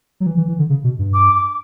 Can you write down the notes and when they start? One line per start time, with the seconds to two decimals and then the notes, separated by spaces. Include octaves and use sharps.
0.20 F#3
0.26 E3
0.37 E3
0.48 E3
0.59 D3
0.70 C#3
0.84 B2
0.99 G2
1.13 D6
1.35 D6